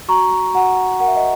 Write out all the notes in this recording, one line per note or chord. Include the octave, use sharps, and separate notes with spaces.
F#4 A#5 C#6
F#4 F#5 A#5
A#4 F#5
E5
D#5